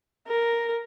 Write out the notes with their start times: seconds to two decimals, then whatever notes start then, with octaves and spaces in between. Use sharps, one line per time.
0.28 A#4